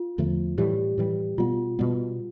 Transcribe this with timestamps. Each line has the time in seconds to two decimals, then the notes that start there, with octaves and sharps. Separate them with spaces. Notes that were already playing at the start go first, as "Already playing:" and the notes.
Already playing: F4
0.18 E2 D3 F3 A3
0.58 A2 E3 G3 G4
0.98 A2 E3 G3
1.38 B2 G3 B3 F4
1.79 B2 G3 B3